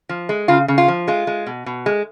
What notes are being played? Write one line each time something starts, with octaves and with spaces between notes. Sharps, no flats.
F3
G#3
C#3 F4
C#3
F4
F3
G#3 F4
G#3
B2
B2
G#3